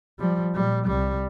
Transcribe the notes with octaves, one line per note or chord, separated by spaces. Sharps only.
F3 G3
A#2 G3
C2 G3